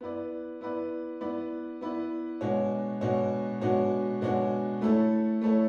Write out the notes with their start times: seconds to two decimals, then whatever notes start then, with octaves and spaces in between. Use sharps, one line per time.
0.01 B3 E4 B4 D5
0.61 B3 E4 B4 D5
1.21 B3 E4 B4 D5
1.81 B3 E4 B4 D5
2.41 B2 G#3 D4 F#4 C#5
3.01 B2 G#3 D4 F#4 C#5
3.61 B2 G#3 D4 F#4 C#5
4.21 B2 G#3 D4 F#4 C#5
4.81 A3 E4 A4 C#5
5.41 A3 E4 A4 C#5